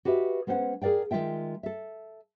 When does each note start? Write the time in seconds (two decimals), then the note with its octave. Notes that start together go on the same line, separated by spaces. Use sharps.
0.05 F#4 G4 B4 D#5 E5
0.47 G#3 B3 C#4 C5 F#5
0.82 G#4 A#4 D5 F5 G5
1.11 D#3 G#3 E4 F4 E5 G5
1.63 A4 E5